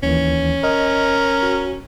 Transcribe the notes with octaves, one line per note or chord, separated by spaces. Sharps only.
D#2 D#3 E3 C#4
A#4 D#5
F#4